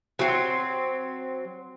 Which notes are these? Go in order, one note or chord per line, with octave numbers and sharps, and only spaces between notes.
F#3 C4